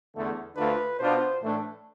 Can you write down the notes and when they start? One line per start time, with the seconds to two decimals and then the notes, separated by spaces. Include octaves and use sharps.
0.15 E2 D3 A3
0.56 D2 D3 A3 D4 F4 B4
0.99 B2 B3 D4 F4 C5
1.41 A2 E3 A3 D4